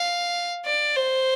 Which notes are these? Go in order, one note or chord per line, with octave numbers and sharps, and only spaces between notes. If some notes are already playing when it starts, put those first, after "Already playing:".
Already playing: F5
D5
C5